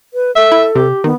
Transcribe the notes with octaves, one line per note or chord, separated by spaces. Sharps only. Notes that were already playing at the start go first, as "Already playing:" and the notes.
B4
A4 E5
E4
C3 G4
D#3 B3